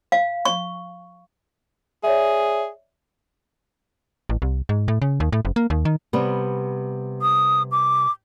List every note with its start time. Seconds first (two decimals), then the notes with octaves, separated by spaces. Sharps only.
0.12 F5
0.45 C#6
2.04 G#4 C#5 D5 E5
4.29 A1
4.42 C2
4.69 G#2
4.88 A2
5.02 C#3
5.20 D#2
5.32 A2
5.45 F#1
5.56 A#3
5.70 D#2
5.85 D#3
6.13 C3 G3 B3
7.22 D#6
7.72 D6